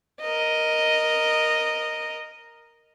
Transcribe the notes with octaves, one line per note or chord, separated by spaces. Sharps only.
A#4 D#5